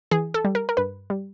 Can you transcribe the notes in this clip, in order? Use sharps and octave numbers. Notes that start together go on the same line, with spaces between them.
E3 G#4
A4
G3
A#4
A#4
G2 B4
G3